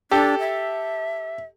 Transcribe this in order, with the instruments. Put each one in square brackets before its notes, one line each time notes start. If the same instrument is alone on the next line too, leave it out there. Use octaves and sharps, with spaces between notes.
[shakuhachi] D4 [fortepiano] G4 A4
[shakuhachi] E5